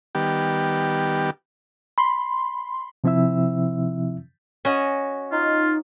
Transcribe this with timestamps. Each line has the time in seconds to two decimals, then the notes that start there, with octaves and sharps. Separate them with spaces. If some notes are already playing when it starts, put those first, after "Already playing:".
0.15 D#3 G3 B3 G4
1.98 B5 C6
3.04 C3 F3 C4 E4 E5 E6
4.65 C#4 F#4 D#5
5.32 D#4 F4